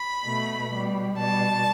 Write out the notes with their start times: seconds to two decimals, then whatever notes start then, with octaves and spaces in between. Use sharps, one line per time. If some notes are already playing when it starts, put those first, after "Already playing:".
Already playing: B5
0.24 B2 A3
0.72 B2 G3
1.17 B2 G3 A5